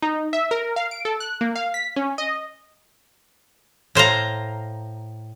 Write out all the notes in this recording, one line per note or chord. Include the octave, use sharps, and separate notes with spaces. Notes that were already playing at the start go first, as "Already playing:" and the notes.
D#4
E5
A#4
F5
D7
A4
F#6
A#3
F5
B6
C#4
D#5
A2 C5 F5 A#5